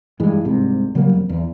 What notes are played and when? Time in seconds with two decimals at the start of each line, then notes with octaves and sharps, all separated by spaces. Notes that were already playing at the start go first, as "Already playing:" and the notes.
0.20 G2 E3 G#3
0.45 C2 G#2 C3
0.95 C#3 F#3 G3 A#3
1.13 F2
1.29 E2